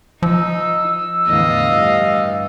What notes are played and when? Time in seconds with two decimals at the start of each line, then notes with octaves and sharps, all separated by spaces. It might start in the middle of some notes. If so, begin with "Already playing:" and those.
0.22 F3 D#4 E6
1.27 E2 A2 D3 D#5 F5
1.69 G2